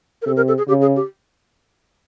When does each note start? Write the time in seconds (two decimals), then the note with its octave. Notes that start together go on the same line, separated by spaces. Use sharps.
0.22 A#4
0.26 C3 A4
0.36 A#4
0.48 A4
0.58 G#4
0.68 C#3 G4
0.82 G#4
0.96 G4